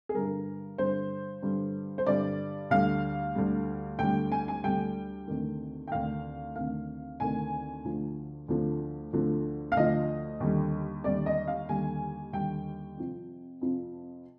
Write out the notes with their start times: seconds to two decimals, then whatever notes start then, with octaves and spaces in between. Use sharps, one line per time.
0.09 G#4
0.14 G2 D3 G3 A#4
0.78 G2 D3 G3 C5
1.43 G2 D3 G3
1.98 C5
2.06 G2 D3 G3 D5
2.70 D2 D3 G3 F5
3.36 D2 D3 G3
3.99 D2 D3 G3 G5
4.32 G#5
4.48 G#5
4.64 D2 D3 G3 G5
5.28 D2 C3 D#3
5.88 G5
5.92 D2 C3 D#3 F5
6.56 D2 C3 D#3 F5
7.20 D2 C3 D#3 G#5
7.84 D2 D3 F3
8.48 D2 D3 F3
9.13 D2 D3 F3
9.72 F5
9.77 D2 D3 F3 D#5
10.40 D#2 D3 G3
11.04 D#2 D3 G3 D5
11.26 D#5
11.48 F5
11.69 D#2 D3 G3 G#5
12.33 D#2 D3 G3 G5
12.97 F2 C3 F3
13.61 F2 C3 F3